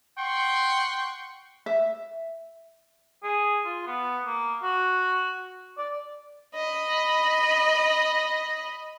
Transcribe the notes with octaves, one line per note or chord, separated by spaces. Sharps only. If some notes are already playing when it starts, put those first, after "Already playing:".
F#5 G5 C6 C#6
E5
G#4
F4
B3
A#3
F#4
D5
D#5 B5